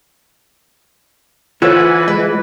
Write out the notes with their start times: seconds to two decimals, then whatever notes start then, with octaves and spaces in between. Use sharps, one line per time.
1.62 E3 F4 A4 C5 C#5 F#5 G#5 B5
2.08 G#3 B4